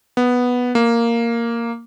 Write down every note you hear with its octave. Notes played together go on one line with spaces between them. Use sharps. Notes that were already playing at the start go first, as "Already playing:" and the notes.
B3
A#3